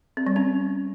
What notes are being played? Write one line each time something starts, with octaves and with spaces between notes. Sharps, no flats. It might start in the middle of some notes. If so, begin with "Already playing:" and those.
C4
G3
C#4